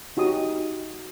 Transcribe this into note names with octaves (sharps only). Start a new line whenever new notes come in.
D#4 F#4 G4 D#6